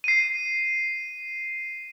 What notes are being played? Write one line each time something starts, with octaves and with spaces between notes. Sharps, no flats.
C7 D#7